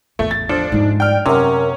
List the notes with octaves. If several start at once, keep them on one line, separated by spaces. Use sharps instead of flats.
A1 E2 A3
A6
F3 D4 A4 C5
G#2 G3 D#4
D5 G5 F6
F#2 C3 A3 C#4 A#4